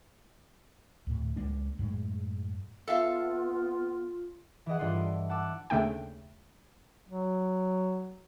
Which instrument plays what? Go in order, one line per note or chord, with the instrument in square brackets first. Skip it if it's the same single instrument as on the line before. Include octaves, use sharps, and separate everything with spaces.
[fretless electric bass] D2 A2
C#2 G#3 A#3 D4
F#2 A2 G#3
[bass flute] B3 [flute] F4 [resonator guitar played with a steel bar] A4 E5 F5
[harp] E3 G#4 D#5 F#5
G2 E3 F4 A4 D#5 C6
E4
F#5 A5 D6 E6
[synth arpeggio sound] D#2 C#3 A3 D4 G5
[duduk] F#3